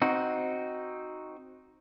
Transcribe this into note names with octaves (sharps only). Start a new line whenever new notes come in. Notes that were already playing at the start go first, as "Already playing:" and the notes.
C4 D#4 F#4